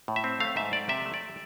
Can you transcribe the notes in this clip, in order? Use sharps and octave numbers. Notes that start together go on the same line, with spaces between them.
A2
E5
C4
A3 F5
G#2 E5
A3 D5
C3 E5
A3
D5